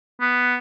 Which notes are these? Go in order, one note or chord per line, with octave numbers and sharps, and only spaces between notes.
B3